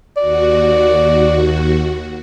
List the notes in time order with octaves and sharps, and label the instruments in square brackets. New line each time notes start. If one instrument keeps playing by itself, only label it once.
[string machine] D#2 F#4 [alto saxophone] D5